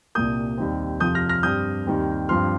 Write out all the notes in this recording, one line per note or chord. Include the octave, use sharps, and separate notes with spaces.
C2 A#2 G3 A#3 D#6 G6
D#2 D#3 G3 C4
F2 C3 F3 D#6 G6
F6 A#6
F6 A#6
G2 G3 C4 D#6 G6
D#2 D#3 G3 C4
G2 F3 C4 C6 F6